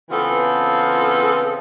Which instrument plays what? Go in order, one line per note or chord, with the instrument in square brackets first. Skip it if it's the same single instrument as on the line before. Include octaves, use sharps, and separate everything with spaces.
[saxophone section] C#3 E3 B3 C4 F4 A4